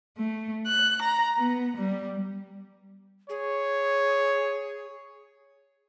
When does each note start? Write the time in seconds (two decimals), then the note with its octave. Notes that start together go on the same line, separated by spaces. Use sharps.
0.18 A3
0.67 F#6
1.00 A#5
1.36 B3
1.76 G3
3.29 G#4 C#5